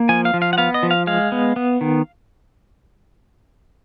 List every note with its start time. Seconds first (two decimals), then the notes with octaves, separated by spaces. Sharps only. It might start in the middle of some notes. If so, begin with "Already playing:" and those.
Already playing: A#3
0.09 F3 G#5
0.25 F5
0.34 F3
0.42 F5
0.53 F#5
0.58 B3 F5
0.74 D#5
0.83 F3
0.91 F5
1.07 G#3 F5
1.32 B3
1.56 B3
1.81 D#3